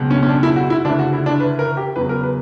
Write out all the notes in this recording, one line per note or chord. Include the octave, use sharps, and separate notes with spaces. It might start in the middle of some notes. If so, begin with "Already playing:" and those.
Already playing: C#2 B2 F#3
C#4
C#4
D4
E4
F#4
E4
D2 C#3 E3 D4
F#4
E4
D4
B4
A#4
G4
E2 C#3 F#3 B4
A#4
B4